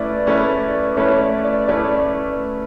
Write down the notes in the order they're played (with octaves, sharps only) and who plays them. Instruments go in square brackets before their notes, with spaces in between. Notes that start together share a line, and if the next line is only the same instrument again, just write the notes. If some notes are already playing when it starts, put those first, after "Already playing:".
Already playing: [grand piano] A3 C#4 E4 B4 [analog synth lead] D5
[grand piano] A3 C#4 E4 B4
[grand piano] A3 C#4 E4 B4 [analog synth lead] C#5
[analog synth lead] D5
D5
[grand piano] A3 C#4 E4 B4 [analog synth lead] D5
[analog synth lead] D5